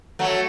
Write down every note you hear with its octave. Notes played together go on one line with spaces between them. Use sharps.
F#3 A3